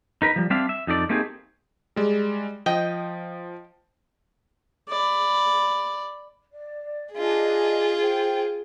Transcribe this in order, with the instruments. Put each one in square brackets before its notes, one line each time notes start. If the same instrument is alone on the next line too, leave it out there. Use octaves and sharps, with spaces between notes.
[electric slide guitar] D#4 A#4 B4
F3 G3
G3 C4 D4 E5 F5
E5
F2 D#4 A4 D5
A3 A#3 C4 D#4 G4 G#4
[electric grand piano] G3 G#3 D5
[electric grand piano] F3 [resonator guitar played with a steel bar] D#5 G5
[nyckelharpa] D5 B5
[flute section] D5
[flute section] D4 D#5 G#5 [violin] F4 G#4
[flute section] C5 G5